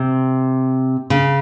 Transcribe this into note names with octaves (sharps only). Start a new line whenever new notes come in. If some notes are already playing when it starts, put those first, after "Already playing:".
Already playing: C3
C#3